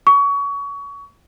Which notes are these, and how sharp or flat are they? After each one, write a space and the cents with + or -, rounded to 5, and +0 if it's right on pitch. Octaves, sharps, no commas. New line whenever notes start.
C#6 +25